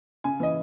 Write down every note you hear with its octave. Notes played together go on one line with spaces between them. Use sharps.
C#3 G#5
E3 D#5